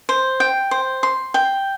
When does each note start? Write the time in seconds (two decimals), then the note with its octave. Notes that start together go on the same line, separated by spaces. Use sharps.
0.09 C5
0.40 G5
0.71 C5
1.03 C6
1.34 G5